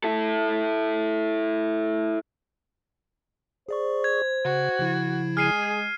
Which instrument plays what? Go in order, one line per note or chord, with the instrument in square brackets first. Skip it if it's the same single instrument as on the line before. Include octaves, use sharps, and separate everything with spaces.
[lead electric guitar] E4 A4
[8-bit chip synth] G#4 D5 C#6 [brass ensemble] C5
[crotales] G#6
[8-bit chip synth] C#3 [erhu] F#4
[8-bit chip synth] C#3 F3 E4
[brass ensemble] G#3 [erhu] G#4 [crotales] F6 C7 D#7